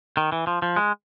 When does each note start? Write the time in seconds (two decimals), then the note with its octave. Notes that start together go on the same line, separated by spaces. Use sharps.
0.17 D#3
0.32 E3
0.47 F3
0.62 F3
0.76 G#3